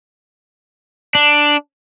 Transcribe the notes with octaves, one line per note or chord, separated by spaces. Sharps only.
D4